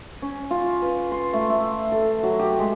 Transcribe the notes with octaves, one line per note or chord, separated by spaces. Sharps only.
C#4
F4
B4
C6
A3
E5
A4
F#3
G4
G#3